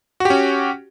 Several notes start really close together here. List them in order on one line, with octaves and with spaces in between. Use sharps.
F#4 G4 C#4